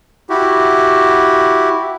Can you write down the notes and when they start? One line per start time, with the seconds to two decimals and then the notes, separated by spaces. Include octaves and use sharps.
0.30 E4 F#4 G4